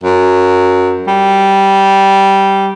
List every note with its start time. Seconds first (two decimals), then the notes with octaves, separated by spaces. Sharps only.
0.03 F#2
1.07 G3